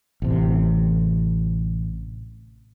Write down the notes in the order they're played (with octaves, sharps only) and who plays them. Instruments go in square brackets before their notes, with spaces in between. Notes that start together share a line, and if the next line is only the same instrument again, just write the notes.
[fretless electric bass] A1 C3